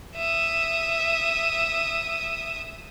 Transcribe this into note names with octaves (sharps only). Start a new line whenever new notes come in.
E5 D#6